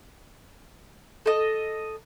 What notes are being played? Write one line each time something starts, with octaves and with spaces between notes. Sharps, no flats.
A4 D#5